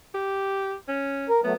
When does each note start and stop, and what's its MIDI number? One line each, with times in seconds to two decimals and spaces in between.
0.14 0.75 67
0.88 1.27 61
1.29 1.41 70
1.44 1.54 54
1.44 1.54 57
1.44 1.55 59